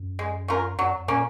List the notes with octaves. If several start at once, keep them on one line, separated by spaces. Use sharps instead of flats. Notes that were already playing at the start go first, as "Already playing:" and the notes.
Already playing: F#2
G#3
C#4 F4 A#4
F#2 F#3
F2
A#2 A#3 C#4